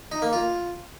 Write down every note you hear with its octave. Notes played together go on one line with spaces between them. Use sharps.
D#4
A#3
F4